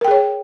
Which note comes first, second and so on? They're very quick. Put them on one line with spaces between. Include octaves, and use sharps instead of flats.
A#4 G5 G#4 C#5